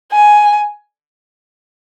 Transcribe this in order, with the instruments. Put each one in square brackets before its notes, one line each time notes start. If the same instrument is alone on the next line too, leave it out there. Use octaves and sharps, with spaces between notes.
[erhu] G#5